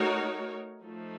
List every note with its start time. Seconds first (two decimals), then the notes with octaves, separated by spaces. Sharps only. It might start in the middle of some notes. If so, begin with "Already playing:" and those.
Already playing: A3 D#4 F#4 A#4 C#5
0.82 F3 A3 D#4